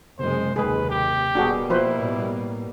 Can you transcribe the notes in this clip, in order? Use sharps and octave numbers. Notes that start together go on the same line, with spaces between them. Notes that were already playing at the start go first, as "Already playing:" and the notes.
F#1 C3 G#3 C5
F#1 D#2 D#3 G#3 G#4 B4
G4
D1 B2 G3 A#3 D4 F#4 G#4
F3 E4 B4 C5
A2